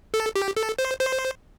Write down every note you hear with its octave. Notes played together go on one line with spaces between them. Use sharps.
A4
G4
A4
C5
C5